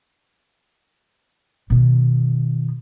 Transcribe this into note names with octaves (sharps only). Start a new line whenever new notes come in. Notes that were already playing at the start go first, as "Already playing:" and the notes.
B2 D#3